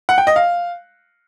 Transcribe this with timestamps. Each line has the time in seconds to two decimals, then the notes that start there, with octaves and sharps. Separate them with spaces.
0.09 F#5
0.18 G5
0.27 D#5
0.36 F5